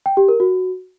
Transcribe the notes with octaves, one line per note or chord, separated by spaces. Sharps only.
G5
G4
A#4
F#4